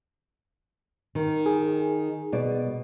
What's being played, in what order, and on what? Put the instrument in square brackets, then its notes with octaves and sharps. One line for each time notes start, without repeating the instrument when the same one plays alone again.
[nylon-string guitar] D#3
[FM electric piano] G#4
[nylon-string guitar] B2 D5